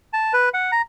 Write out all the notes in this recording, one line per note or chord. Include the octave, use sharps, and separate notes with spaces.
A5
B4
F#5
A#5